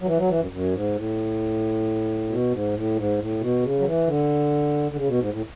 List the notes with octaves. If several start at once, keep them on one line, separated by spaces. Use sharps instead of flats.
F#3
E3
F#3
E3
F#2
F#2
G#2
A2
B2
G#2
A2
G#2
A2
B2
C#3
F#3
E3
D3
D3
C#3
B2
G#2
A2